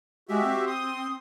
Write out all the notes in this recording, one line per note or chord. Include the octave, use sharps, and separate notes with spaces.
G#3 F#4 G4 E5
C4
C6 D#6